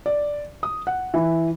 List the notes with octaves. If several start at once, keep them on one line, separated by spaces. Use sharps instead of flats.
D5
D#6
F#5
E3